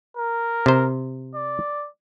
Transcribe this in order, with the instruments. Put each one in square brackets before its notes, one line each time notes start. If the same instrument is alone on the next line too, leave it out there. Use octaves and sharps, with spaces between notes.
[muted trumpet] A#4
[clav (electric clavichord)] C3 C5
[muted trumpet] D5